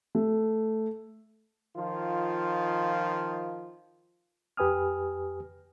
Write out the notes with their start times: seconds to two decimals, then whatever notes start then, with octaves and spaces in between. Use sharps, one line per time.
0.15 A3
1.76 D#3 F3 F4
4.57 F2 G4 B4 G#5 D#6 F6